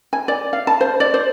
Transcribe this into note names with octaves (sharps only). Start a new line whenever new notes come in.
G#5
D5
F5
A5
C5
D5
C5